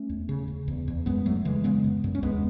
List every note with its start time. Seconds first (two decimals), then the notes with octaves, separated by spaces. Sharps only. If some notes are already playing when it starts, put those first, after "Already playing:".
Already playing: A3 C#4
0.09 E2
0.29 C#3
0.48 C#3
0.68 E2
0.88 E2
1.06 F#2 G#3 B3
1.25 F#2 F#3 A3
1.45 C#3 E3 G#3
1.64 C#3 G#3 B3
1.84 F#2
2.04 F#2
2.15 C#4
2.23 D#2 G#3 B3